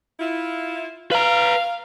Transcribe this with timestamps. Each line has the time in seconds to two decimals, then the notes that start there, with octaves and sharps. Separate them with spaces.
0.20 E4 F4
1.11 B4 F5 A#5